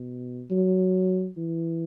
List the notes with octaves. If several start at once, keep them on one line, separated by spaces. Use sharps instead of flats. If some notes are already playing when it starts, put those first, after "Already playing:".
Already playing: B2
F#3
E3